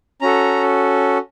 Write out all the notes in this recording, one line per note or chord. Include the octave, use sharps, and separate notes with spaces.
C#4 F#4 A4 A#5